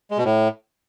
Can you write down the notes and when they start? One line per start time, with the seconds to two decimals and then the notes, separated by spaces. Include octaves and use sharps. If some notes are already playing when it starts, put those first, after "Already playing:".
0.11 G#3
0.18 B2
0.25 A2